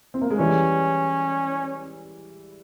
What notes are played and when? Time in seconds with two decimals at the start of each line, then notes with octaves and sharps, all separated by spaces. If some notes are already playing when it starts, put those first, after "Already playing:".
0.14 C4
0.21 A#3
0.31 G#3
0.39 E3 G3 C#4